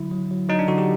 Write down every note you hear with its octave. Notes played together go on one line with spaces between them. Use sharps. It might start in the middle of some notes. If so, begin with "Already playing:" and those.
Already playing: D3 F#3 E4
F#3
F#3
F#3 D#4
D4
D3 F#4
G4